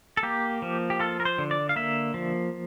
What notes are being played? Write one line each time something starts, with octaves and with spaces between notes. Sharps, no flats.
A4
A#3 G4
F3
G4
F4 A4
A#4
C5
D3
D5
F5
A#3 E5
F3